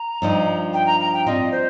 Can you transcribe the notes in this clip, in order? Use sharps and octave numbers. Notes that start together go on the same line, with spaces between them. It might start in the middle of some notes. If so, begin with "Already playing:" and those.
Already playing: A#5
G2 F3 D#4
G5
A#5
A#5
G5
G3 C4 F4 D#5
C5